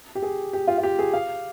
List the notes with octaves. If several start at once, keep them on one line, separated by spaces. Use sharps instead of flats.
G4
G#4
G4
F4
F4
G4
G#4
F5